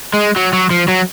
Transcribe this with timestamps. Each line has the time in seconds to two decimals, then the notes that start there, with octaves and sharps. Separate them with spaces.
0.13 G#3
0.36 F#3
0.53 F#3
0.71 F3
0.88 F#3